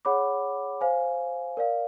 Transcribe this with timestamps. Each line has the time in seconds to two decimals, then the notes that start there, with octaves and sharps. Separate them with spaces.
0.05 G#4 C#5 F#5 B5 D6
0.81 C5 F5 G#5
1.57 A#4 D5 F5